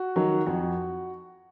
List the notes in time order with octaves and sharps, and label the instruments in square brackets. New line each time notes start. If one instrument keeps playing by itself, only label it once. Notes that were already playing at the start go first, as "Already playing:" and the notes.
Already playing: [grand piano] F#4
D#3 F#3
F2 F#4